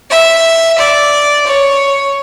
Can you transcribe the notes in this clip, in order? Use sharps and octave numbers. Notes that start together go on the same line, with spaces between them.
E5
D5
C#5